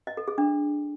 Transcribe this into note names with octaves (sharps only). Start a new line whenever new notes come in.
D#5
A4
G#4
D4